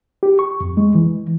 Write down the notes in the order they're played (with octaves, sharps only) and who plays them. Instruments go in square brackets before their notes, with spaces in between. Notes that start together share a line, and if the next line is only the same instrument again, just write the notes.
[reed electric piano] G4
C#6
F2
G#3
E3